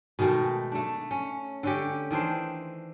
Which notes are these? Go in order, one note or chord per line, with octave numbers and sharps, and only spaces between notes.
B2 D#3 G#3 A3
A3 D4
C#4
D3 C#4 G4
D#3 E3 D4 C5